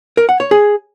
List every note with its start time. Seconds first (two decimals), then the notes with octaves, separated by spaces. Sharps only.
0.17 A#4
0.29 F#5
0.40 C#5
0.51 G#4